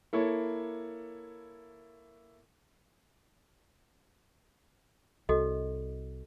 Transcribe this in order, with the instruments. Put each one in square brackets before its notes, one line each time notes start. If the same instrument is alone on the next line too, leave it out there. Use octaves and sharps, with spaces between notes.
[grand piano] A#3 E4 A4 C#5
[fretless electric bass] C2 [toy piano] F#4 A4 D#5